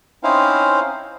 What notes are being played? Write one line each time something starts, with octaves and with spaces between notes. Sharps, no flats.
C4 C#4 D#4 E4 C5 F5